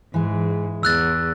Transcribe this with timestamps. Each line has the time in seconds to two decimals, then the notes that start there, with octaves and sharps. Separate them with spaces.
0.14 G#2 E3 G#3
0.83 E2 E6 F#6 A6